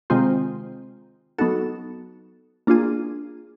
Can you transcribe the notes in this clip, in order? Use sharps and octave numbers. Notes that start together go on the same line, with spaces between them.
C3 D#3 G#3 C4 F4
F#3 B3 D#4 F#4 A4
A#3 D4 F4 G#4